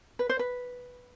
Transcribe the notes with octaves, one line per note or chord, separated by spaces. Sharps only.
B4
C5
B4